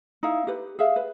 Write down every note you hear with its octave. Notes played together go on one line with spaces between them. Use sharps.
D#4 E4 F5
G4 B4
G#4 E5 F5
B4